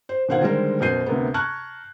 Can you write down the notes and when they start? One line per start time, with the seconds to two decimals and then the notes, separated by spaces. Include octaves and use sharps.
0.09 C5
0.29 B2 D#3 C5 F5 F#5 G#6
0.41 D3 D#3 G3 G#3 A#4 C5
0.80 F#2 B2 C5 G6 C7 D#7
1.06 D2 C3 A#3 B3
1.34 A5 A#5 C#6 F6 F#6 G#6